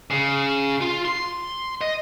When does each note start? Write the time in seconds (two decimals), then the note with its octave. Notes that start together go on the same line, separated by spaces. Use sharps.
0.11 C#3
0.81 F4
1.05 C6
1.81 D#5